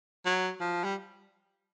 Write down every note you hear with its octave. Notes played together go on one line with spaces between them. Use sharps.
F#3
F3
G3